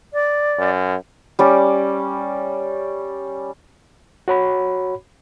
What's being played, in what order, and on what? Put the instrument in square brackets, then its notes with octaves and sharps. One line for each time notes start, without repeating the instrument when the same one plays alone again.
[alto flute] D5
[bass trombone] F#2
[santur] G3 C#4 D5
[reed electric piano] F#4 C#5 B5